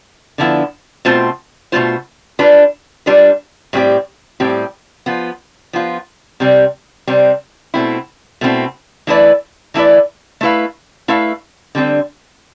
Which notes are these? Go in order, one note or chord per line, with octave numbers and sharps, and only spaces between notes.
D3 F3 B3 E4
B2 A3 C4 F4 C5
B2 A3 C4 F4 C5
G3 D4 F4 B4
G3 D4 F4 B4
A2 G3 C4 G4
A2 G3 C4 G4
F3 B3 F4
F3 B3 F4
C3 G3 C4
C3 G3 C4
B2 A3 C4 E4
B2 A3 C4 E4
E3 A3 E4 B4 D5
E3 A3 E4 B4 D5
A3 E4 B4 F5
A3 E4 B4 F5
D3 G3 C4